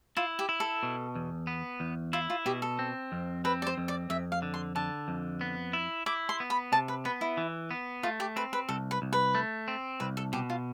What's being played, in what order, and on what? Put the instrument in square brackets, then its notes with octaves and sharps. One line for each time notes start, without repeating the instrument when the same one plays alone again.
[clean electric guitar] E4 [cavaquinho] F4
[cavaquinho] G4
[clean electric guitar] E4
[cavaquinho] A4
[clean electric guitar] B2
E2
B3
E2
[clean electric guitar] E4 [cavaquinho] F4
[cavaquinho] F4
[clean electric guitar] B2 [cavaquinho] G4
[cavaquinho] A4
[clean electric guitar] C4
F2
[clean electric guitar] C4 [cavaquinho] B4
[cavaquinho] D5
C5
[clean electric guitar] F2
[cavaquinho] D5
[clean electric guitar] F2 [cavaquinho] E5
[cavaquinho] F5
[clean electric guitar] D3
[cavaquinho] C6
[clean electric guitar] D3 [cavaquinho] A5
[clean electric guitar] F2
B3
E4
[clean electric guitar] E4 [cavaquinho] D6
[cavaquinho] C6
[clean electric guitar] B3
[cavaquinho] B5
[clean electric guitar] C3 [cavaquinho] A5
[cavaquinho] B4
[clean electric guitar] B3 [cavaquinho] B4
[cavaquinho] E4
[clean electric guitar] E3
B3
[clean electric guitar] A3 [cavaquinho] F4
[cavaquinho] G4
[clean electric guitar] C4 [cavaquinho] B4
[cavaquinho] B4
[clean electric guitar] C2 [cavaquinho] A4
[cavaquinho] B4
[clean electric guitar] C2
[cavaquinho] B4
[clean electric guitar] A3
C4
[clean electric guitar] C2 [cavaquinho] B4
[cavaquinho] A4
[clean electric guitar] B2 [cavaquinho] G4
[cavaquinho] F4